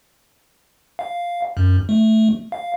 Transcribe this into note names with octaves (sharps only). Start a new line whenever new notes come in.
F5
F#2
A3
F5